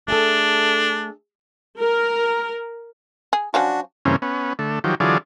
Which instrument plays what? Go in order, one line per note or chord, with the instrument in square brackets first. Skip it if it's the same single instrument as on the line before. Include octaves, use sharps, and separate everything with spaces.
[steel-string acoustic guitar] A3 G#4 A4 [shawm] D4
[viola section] A#4
[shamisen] G#4
[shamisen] F3 F#3 C#4 [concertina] D4 F#4
[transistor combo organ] G2 C#3 E3 A#3 C4 C#4
B3 C#4
D3 A3
D#3 F3 F#3 G4
D3 E3 F#3 F4 G#4 D5